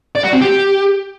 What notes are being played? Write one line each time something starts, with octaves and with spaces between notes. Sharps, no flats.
D5
F#4
C4
G4